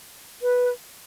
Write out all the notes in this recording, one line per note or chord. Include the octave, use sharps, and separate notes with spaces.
B4